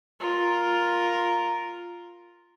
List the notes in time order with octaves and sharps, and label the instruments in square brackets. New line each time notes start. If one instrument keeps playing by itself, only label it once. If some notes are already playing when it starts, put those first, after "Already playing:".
[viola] F4 A#4